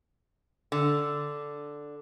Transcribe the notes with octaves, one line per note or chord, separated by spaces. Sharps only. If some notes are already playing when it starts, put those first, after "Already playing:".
D3